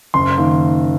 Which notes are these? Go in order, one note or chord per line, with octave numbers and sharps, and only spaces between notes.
F#1 C6
D#3 A#3